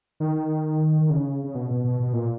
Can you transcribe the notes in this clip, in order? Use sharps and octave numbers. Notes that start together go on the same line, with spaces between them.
D#3
D#3
C#3
C#3
B2
B2
B2
B2
A#2